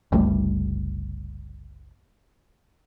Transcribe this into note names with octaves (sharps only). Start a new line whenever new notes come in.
F#1 C2 G3 A3